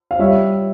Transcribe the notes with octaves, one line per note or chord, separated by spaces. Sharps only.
F5
G3 C#5 E5